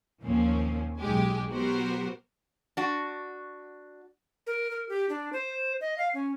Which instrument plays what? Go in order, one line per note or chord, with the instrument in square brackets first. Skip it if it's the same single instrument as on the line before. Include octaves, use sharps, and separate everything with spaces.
[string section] D#2 A#2 F3 A#3 C4 C#4
B1 G#3 G4 G#5
F#3 B3 F#4 G4 A#4 C5
[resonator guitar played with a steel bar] D4 F#4
[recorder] A#4
A#4
G4
D4
C5
D#5
F5
C#4